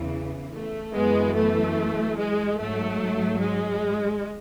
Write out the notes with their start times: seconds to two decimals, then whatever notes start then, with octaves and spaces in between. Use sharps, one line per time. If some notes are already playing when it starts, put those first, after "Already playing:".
Already playing: E2 C#3 E3
0.53 A3
0.94 F#2 E3 G#3 B3
1.36 A3
2.18 G#3
2.58 G#2 F#3 A3
3.40 G#3